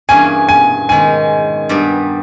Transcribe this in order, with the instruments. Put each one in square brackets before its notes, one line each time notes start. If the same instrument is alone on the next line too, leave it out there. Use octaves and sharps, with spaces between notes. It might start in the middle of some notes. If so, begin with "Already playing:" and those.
[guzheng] G2 E3 A#3 C#4 G#4 [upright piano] G#5
[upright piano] G#5
[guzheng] G#2 D#3 G#3 [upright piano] G#5
[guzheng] G2 G3 B3 G4